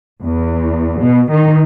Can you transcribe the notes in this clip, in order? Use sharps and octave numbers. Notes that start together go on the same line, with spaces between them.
E2
B2
D#3